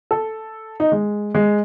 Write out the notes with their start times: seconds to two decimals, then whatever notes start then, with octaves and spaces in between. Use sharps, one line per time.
0.11 A4
0.80 D#4
0.92 G#3
1.35 G#3